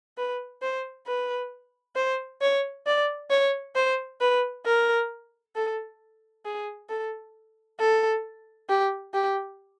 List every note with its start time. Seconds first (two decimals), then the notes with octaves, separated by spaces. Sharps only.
0.18 B4
0.62 C5
1.07 B4
1.96 C5
2.41 C#5
2.86 D5
3.30 C#5
3.75 C5
4.21 B4
4.66 A#4
5.56 A4
6.45 G#4
6.89 A4
7.80 A4
8.69 G4
9.14 G4